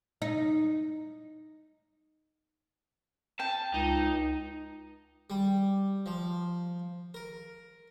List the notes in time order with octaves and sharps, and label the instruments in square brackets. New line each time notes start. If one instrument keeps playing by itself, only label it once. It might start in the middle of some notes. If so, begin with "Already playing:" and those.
[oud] D#4
[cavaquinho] G5 [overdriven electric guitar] A5
[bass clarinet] C#2 [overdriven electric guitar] D#4
[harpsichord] G3
F3
A#4